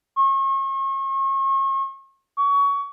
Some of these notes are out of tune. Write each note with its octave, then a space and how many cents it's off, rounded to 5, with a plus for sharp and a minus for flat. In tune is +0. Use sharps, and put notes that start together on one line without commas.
C#6 -40
C#6 +25